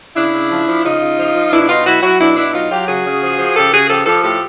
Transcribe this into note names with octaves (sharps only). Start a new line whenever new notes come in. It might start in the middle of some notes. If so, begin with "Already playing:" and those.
C#3 D4 E4
C#3
F3
F3
C#3 D#4 F4
C#3
F3
F3
B2 D4 E4
E4
B2 D#4 F4
F#3 E4 F#4
F#3 E4 F#4
B2 D4 E4
B2 D4 E4
F#3 D#4 F4
F#3 F4 G4
C#3 F#4 G#4
C#3
F3
F3
C#3 G4 A4
C#3 F#4 G#4
F3 G4 A4
F3 G4 A4
A2 G4 A4